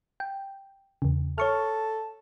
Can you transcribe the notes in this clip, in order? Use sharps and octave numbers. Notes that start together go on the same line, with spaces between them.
G5
E2 C#3
A4 C#5 C#6 F6